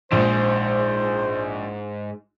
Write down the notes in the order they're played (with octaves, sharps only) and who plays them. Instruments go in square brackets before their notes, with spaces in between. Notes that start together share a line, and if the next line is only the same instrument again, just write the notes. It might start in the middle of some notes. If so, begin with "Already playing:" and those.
[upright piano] A#1 [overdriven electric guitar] E2 G#2 [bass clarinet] C5